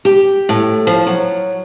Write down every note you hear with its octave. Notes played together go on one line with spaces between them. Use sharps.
G4
A2
F3
F#3